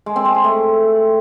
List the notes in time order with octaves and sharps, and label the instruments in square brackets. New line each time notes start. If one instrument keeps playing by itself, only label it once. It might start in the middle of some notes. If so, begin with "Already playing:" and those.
[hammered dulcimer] G#3
C4
G#3
G#4
A3